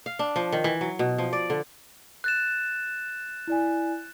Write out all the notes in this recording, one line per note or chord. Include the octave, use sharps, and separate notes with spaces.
F5
D4
F3
D#3
E3
F#3
B2
F3
D5
D3
F#6 A6 E7
E4 D5 G#5